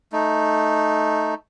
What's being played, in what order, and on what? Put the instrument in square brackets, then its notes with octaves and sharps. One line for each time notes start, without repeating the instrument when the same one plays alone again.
[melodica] A3 D#4